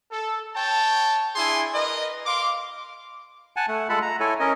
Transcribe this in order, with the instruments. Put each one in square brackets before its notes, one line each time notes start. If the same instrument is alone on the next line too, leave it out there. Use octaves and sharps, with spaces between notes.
[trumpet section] A4
C#5 G5 A5
D4 E4 G#4 G#5 C6
A#4 B4 D#5
F5 C6 D6
[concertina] F#5 G#5 A5
A3 F#5
G#3 F4 A4 F#5 A5 B5
A#5
E4 A4 C#5 G#5
C#4 A#4 D#5